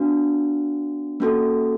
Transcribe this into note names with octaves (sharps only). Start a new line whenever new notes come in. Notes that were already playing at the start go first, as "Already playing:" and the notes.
Already playing: B3 D4 F#4
A#3 C#4 F#4 A4